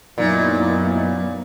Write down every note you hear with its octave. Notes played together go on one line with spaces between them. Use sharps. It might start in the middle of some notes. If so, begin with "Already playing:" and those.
F#2 A#2 F#3 A#3 B3 D#4 E4